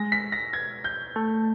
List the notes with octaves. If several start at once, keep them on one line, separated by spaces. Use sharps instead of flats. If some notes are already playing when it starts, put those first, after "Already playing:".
Already playing: G#3 A#6
B6
A#6
G#6
G6
A3